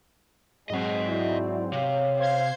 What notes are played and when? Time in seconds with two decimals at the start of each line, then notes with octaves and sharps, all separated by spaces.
0.70 G#2 F#3 G#3 C4 D#5 F#5
1.08 E4 F#4 D5
1.73 C3 C#5 F5
2.20 C5 F5 G#6 C7